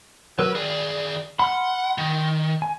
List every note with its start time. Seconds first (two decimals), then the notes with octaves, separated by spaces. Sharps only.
0.39 F#3 A#4 B4 E6
0.55 D#3 G#4 D5
1.39 F#5 B5 C6 F6
1.98 D#3
2.62 G#5